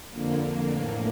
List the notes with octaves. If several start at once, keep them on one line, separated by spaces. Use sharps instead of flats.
F2 D3 A#3
A2 E3 A#3